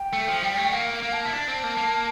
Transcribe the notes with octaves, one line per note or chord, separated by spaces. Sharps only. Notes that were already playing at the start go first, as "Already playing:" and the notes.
Already playing: G5
A3
F3
G3
A3
A#3 F5
F5
A#3
A5
E4
D4 A5
C4
A#3
A#3